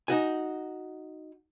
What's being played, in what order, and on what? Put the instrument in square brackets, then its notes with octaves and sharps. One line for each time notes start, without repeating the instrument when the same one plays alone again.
[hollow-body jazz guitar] D#4 F#4 G#5